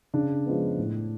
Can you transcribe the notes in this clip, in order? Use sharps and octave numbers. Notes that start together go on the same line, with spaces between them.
C#3 D4
F3 G#3 B3
A2